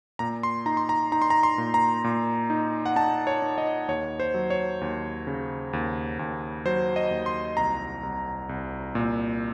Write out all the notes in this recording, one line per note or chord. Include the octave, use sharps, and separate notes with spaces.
A#2 A#5
C6
D#4 A#5
C6
A#5
D#4 A#5
C6
A#5
C6
A#2
A#5
A#2
D#4
F#5
D#4 A5
C#5
D#4
D#5
D#2 C#5
C5
F#3
C#5
D#2
C#3
D#2
D#2
F#3 C5
D#5
D#2
C6
C2 A#5
C2
C2
A#2